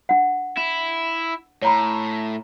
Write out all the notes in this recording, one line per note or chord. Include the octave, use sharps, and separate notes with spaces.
D4 F#5
E4
A2 C#5 A#5 B5